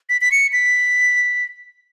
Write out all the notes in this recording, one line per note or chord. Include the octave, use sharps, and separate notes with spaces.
B6
B6
C#7
B6